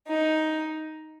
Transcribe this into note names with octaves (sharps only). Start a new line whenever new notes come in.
D#4